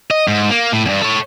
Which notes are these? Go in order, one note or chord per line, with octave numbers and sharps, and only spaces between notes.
D#5
G#2
A#3
A2
E2 G2
A4 C#5